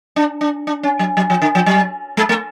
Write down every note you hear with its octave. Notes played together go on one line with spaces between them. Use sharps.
D4
D4
D4
C#4
F#3
F#3
F3
D3
F3
F#3
G#3
A3